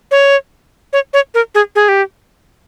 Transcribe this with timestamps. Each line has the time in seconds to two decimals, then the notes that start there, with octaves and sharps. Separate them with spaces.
0.11 C#5
0.93 C#5
1.14 C#5
1.34 A#4
1.55 G#4
1.75 G#4
1.89 G4